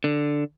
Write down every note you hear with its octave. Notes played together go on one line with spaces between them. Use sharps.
D3